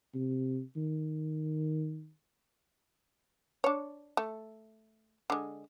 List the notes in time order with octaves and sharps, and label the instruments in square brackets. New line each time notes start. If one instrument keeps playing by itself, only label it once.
[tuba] C3
D#3
[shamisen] D4 C#5
A3
D3 G#3